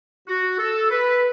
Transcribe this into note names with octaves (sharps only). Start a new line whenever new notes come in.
F#4
A4
B4